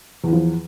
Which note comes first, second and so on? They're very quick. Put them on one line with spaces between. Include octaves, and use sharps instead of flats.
E2 E3 F3